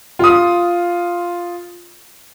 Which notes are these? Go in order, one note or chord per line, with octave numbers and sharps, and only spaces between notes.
F4 D#6